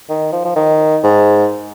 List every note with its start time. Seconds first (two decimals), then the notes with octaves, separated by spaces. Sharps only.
0.10 D#3
0.32 F3
0.45 F3
0.56 D#3
1.03 G#2